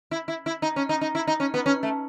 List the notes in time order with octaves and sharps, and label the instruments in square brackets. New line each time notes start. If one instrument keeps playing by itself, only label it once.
[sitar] E4
E4
E4
D#4
C#4
D#4
D#4
E4
D#4
C#4
B3
C#4
A3